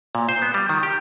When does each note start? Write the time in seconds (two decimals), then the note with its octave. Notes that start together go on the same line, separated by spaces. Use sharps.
0.15 A#2
0.29 C5
0.42 B3
0.54 G3
0.69 D#3
0.83 G4